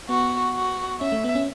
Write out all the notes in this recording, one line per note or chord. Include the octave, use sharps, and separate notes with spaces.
B3 F#4
F#4
C#4 E5
A3
B3
C#4